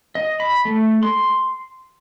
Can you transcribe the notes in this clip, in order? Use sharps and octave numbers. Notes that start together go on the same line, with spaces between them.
D#5
B5
A3
C6